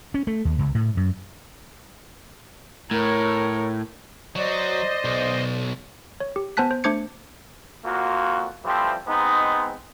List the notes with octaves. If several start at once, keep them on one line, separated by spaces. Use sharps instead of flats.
C#4
A3
D#2
C#2
A2
F#2
A2 A#4 C#5
F#3 C5 D5 D#5
B1
C#5
G4
B3 C5 G#5 A5 F#6 B6
C5
A3 D4 C5 D6 G#6 C#7
F2 A#3 F4 F#4
E3 F3 G3 A3 C4 G4
G#3 B3 C4 D#4